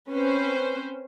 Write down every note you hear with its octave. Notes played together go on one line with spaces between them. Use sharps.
C4 C#4 B4 C5